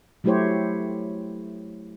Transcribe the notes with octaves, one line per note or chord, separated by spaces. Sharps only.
F#3 A3 E4 G4 C5 C#5